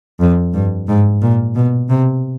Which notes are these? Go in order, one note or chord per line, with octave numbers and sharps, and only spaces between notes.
F2
G2
G#2
A#2
B2
C3